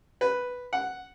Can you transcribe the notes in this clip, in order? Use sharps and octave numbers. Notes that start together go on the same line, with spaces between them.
B4
F#5